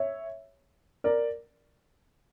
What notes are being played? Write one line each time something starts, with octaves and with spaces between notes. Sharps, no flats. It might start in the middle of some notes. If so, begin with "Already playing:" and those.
Already playing: C#5 E5
A#4 D5